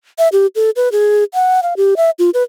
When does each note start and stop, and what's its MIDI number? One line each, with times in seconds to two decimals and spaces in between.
0.18 0.28 76
0.32 0.47 67
0.55 0.70 69
0.76 0.89 71
0.92 1.24 68
1.34 1.61 78
1.63 1.74 77
1.77 1.94 67
1.97 2.10 76
2.19 2.30 65
2.34 2.43 71